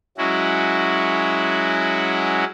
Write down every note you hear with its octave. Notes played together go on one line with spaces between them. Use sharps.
F#3 G#3 C#4 E4 F#4